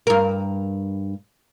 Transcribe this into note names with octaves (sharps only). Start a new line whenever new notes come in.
G2 A#4